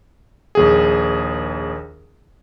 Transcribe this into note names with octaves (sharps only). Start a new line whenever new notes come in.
A#1 D#2 G#4